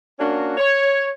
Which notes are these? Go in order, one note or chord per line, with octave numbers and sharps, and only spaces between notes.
A#3 C#4 D4 F#4
C#5